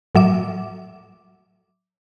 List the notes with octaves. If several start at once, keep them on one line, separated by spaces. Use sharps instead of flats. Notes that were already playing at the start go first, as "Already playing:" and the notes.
A2 F#3 E5 D6